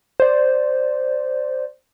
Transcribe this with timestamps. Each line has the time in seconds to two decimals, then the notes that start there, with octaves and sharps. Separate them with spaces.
0.20 C5 D5